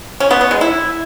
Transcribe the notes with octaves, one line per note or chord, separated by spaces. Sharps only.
C#4
B3
B3
G#3
E4